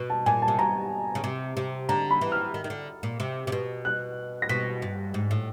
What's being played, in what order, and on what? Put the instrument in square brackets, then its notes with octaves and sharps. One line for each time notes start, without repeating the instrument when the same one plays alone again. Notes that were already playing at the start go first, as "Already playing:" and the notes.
Already playing: [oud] B2
[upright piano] A5
[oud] A#2 [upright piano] G#5
[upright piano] A5
[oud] C3
[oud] B2 [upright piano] A#5
[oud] C#3
C3
C3
[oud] D3 [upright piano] A#5
[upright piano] B5
[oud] E3
[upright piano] F6
[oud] D#3
D#3
D3
A#2
C3
C3
B2
[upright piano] F#6
A#6
[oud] B2 [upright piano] B6
[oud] G2
G#2
A2